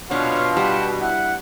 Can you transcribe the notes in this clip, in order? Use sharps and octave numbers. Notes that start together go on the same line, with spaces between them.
B2 D4 F4 C#5 F5 F#5
G3 F#5 G5 A5
E4 F#5